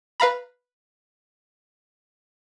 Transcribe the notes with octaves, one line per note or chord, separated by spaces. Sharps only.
B4 F5 A#5 B5